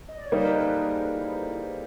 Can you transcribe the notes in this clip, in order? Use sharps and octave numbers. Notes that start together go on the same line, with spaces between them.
D#5
D5
C#5
G3 A#3 D#4 A#4 C5
A4 B4
B4
G#4 A#4
E4